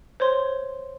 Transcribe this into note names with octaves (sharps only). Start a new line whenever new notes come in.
C5 C#5 C6